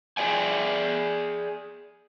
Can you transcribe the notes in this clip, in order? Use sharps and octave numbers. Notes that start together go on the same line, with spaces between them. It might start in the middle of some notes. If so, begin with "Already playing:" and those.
G#4 A#4 D5 G5 G#5